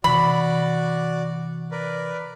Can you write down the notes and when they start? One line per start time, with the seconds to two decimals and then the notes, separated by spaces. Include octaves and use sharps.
0.04 C3 E3 F#4 D5 B5
1.72 A#4 B4 D5